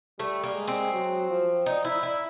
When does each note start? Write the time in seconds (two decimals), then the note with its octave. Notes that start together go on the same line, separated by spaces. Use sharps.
0.19 G3 A3
0.43 A#3
0.55 G#3
0.68 C4
0.93 F#3
1.29 F3
1.66 D#4
1.85 E4
2.03 E4